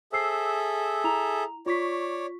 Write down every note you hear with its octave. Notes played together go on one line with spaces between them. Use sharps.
G#4 A4 C5 E5 E6 C7
E4 A#5 F7
F4 C#5 D5 C#6 B6